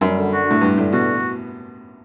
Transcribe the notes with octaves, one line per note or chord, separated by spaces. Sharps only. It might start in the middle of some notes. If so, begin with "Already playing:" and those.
F#2 G3
D3
F#4
A2 D4
G2 G3
A2 D3
B2 F#4